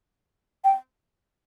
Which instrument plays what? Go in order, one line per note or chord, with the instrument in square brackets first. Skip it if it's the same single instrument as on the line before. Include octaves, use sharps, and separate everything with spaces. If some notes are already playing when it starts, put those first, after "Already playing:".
[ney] G5